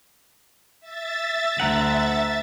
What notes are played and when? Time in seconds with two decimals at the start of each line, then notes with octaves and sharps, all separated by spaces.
0.81 E5 A6
1.60 D2 F#5 A#5